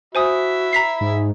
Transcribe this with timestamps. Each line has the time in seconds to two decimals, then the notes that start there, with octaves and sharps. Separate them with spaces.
0.15 F#4 C5 E5 G#5 B5 D#6
0.73 A#5 B6 C7
1.01 G#2 G#4